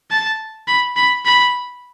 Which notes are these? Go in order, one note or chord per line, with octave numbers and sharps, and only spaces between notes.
A5
B5
B5
B5